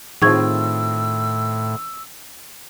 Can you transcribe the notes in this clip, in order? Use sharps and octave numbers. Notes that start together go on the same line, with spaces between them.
A2 D#3 C4 F4 G#4 C#6 E6 G#6